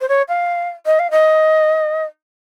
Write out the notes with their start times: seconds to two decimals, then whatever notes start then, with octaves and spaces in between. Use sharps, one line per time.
0.01 C5
0.08 C#5
0.28 F5
0.86 D#5
0.99 F5
1.11 D#5